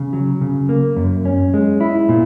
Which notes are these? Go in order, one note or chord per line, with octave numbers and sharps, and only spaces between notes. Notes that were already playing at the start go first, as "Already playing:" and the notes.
Already playing: C#3
F#3
C#3
A#3
F#2
C#4
G#3
E4
A#2